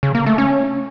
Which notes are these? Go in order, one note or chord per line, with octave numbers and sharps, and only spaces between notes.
C#3
A#3
A3
C#4